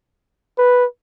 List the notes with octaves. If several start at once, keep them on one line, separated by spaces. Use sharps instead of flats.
B4